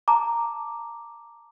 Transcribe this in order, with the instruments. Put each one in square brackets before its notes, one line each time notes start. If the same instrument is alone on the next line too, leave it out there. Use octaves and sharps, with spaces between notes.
[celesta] A5 A#5 D6